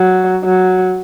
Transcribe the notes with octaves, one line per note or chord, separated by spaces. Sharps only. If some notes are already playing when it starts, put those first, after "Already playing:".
Already playing: F#3
F#3